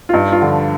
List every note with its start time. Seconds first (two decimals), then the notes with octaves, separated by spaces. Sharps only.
0.09 F4
0.14 G2 D#4
0.32 F4
0.41 D3 F3